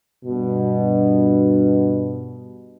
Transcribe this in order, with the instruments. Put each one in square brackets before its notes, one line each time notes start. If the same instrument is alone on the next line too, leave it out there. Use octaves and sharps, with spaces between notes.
[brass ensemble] G2 B2